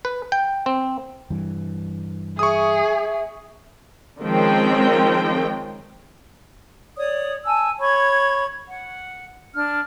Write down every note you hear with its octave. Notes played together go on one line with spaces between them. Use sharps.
B4
G5
C4
G2 E3 G3
G#4 E5 C#6 D#6
D#3 F3 G#3 C4 C#4 G5
C#5 D5 D#6
G#5 A5 E6
C#5 B5 C#6 G#6
F#5
D4 F6